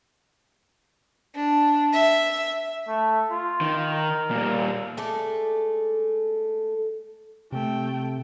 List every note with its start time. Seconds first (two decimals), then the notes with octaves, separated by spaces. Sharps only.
1.35 D4
1.93 E5
2.88 A3
3.31 F4
3.61 D#3
3.92 A#4
4.31 A#2 G3
4.97 G#3 A3 A4 D5
7.52 C3 A3 G5